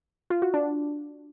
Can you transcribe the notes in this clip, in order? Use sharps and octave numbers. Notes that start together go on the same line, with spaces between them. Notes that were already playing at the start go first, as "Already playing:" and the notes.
F4
F#4
D4